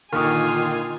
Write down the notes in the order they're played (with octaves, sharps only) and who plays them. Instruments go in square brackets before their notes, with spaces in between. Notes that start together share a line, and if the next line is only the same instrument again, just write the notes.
[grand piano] A#2 D3 C#6 [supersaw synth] D#3 [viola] F4 G#5 [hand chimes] D#6 F6